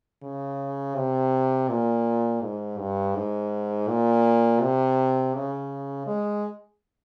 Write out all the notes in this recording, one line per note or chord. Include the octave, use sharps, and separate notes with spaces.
C#3
C3
A#2
G#2
G2
G#2
A#2
C3
C#3
G#3